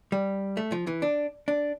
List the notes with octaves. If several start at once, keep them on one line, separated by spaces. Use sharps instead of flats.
G3
A3
F3
E3
D4
D4